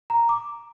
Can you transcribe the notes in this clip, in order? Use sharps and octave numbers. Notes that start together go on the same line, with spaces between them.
A#5
D6